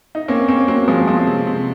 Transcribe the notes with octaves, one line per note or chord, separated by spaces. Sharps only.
D#4
A#3 C4 C#4
A#3 C4 C#4
F#3 A#3 C4
F3 G#3 C4
F3 G#3 C4
C3
C3